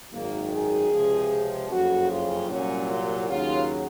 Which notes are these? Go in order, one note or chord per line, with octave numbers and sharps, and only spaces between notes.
G#1 F#2 D#3 A#3
G#4
C#2 C3 F3
F#1 F2 C#3 F#4
F4
C2 A#2 F#3 C#4
F4
D#2 C#3 F#3 F4